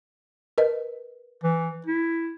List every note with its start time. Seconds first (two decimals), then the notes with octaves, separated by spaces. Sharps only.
0.58 A#4 B4 D#5
1.44 E3
1.86 E4